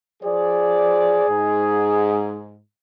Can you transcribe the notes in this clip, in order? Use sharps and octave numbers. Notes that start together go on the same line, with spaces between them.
F3 G#4 C5 D5
G#2